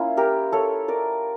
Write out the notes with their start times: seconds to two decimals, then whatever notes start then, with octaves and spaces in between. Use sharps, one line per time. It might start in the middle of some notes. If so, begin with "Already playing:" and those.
Already playing: A#3 C#4 E4 F4
0.17 G4 A#4
0.52 A4 C#5
0.88 A#4 D5